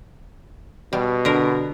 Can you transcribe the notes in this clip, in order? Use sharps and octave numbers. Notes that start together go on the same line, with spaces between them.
B2 G3
D3 A#4